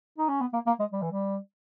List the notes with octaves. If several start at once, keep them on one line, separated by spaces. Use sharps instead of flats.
D#4
C#4
B3
A#3
A#3
G#3
G3
E3
G3